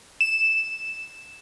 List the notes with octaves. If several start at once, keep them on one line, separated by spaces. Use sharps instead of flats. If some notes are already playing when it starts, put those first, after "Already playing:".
E7